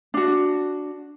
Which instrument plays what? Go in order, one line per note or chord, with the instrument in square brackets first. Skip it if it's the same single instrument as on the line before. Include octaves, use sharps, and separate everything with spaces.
[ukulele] D4 F#4